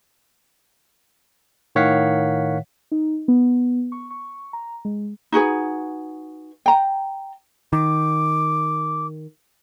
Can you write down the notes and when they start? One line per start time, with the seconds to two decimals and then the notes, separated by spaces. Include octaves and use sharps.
1.75 A2 D#3 C#5 F5 F#5 B6
2.92 D#4
3.28 B3
3.92 C#6
4.10 C#6
4.53 A#5
4.85 G#3
5.32 D#4 F#4 G#4 B4
6.66 G5 A#5
7.73 D#3 D6